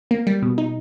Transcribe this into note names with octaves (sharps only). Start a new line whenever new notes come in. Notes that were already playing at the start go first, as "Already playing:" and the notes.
A#3
G3
B2
D#4